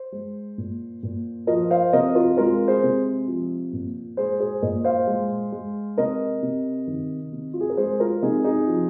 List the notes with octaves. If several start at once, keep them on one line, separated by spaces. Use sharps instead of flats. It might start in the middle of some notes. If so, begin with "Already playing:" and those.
Already playing: C5
G#3
A#2
A#2
F3 A#4 D#5
C5 F5
C3 A#4 D#5
F4 A#4
G#3 F4 A#4
G#4 C5
C3
F3
A#2
G#3 G#4 C5
G#4 C5
A#2 A#4 D#5
C5 F5
G#3
G#3
C3 A#4 D#5
C3
D#3
C3
F4
G#4
A#4
G#3 G#4 C5
F4 A#4
C3 D#4 G#4
D#4 G#4
F3